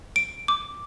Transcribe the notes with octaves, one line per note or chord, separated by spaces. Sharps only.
D7
D6